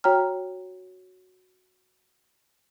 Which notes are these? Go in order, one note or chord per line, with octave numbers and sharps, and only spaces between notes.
F#4 C#5 G5 A#5 F6